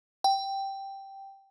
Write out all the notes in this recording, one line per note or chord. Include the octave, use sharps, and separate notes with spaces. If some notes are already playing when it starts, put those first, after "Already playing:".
G5